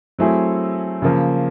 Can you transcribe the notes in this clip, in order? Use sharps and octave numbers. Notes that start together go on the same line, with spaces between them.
F#3 A3 C4 E4 G#4
C#3 F3 A#3